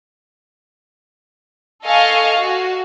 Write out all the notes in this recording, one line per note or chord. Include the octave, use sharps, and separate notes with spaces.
A4 D#5 F5 G#5 C#6
F#4